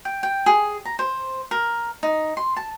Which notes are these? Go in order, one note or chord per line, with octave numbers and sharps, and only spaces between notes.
G5
G5
G#4
A#5
C5
A#4
D#4
C6
A5